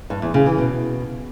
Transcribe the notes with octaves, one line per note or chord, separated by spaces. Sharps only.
G2
E2
C#3
E3
B2